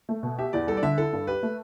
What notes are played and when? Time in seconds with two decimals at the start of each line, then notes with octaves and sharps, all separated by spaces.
0.09 A3
0.23 B2
0.39 G4 E5
0.53 E2 D5
0.67 G3 A4
0.77 D5
0.82 D3 E5
0.98 E4 A4
1.13 G2
1.27 G4 B4
1.43 A3